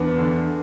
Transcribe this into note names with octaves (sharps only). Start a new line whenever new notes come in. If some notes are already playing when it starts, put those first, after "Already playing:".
Already playing: E2 B3 D4
D3